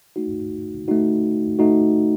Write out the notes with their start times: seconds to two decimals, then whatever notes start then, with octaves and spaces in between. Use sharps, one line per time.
0.16 A3 D#4 F#4
0.88 A3 D#4 F#4
1.59 A3 D#4 F#4